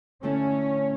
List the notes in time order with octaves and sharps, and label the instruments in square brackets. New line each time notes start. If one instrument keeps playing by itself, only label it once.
[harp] D3 A3 E4 A4 [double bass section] C#4